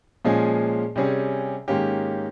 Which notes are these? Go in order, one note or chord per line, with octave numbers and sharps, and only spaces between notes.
A#2 F3 G#3 C#4 G#4
C3 G3 C#4 G#4
G#2 D#3 A#3 C#4 G4